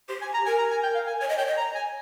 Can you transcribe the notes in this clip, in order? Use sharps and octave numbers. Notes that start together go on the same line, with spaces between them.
G4 C5
G#5
A#5
A#4 G#5
A#5
G#5
G5
F5
G#5
C#5 G#5
D#5
C#5 G5
D#5
A#5
G#5